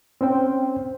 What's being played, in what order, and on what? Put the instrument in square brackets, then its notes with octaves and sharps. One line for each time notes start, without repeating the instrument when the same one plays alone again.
[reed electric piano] C4 C#4 C5 G5